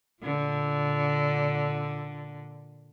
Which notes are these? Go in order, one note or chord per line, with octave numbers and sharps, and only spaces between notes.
A#2 D3